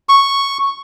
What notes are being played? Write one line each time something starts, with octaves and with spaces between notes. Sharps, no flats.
C#6